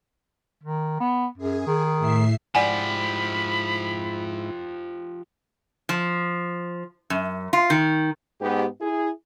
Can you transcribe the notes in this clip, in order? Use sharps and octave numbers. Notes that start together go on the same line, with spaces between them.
D#3
B3
F#2 G#4
D#3
A2 E5 C7
G#2 F3 E4 G4 D5 F#5 G#5 B5
F3
F#2
F4
D#3
G#2 B3 G4
E4 G#4